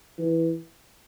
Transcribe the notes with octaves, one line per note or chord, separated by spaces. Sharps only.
E3